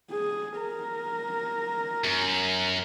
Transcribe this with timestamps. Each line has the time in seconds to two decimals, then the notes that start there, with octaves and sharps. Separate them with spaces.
0.11 G#4
0.60 A#4
2.04 F#2